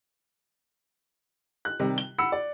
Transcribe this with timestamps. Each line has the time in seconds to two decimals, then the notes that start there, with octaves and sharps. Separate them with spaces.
1.65 F#6
1.80 C3 D#3 G3
1.98 G7
2.18 F#5 B5 E6 C#7
2.32 D5